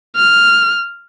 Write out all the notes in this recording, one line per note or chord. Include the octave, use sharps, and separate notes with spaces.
F6